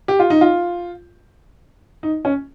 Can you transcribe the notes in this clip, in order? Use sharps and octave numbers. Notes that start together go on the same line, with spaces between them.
G4
F4
D#4
F4
D#4
C#4